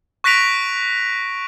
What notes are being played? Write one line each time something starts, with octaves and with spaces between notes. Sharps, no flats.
C#6 F#6 A#6 B6 D7 F7